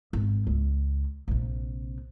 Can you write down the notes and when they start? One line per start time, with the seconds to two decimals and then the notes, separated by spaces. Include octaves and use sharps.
0.13 G#1
0.47 C#2
1.28 A#1 C3